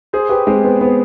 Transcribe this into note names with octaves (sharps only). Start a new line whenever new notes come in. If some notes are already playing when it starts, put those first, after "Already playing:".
G#4 C5
G4 B4
G#3 C4
B3
B3